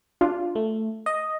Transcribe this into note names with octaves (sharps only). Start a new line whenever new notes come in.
D4 F4
A3
D#5